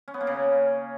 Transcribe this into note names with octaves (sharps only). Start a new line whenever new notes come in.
C#4
B3
A#3
C#3